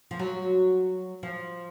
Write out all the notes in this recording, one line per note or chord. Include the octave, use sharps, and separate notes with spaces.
F3
F#3
F3